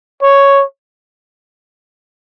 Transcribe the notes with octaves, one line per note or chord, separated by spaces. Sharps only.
C#5